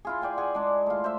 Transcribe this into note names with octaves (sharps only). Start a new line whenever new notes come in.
E4 F4 G#4
D5 G5 G#5 C6
G#4 F#5 G#5
G#3 D4
A3 F4
C5 E5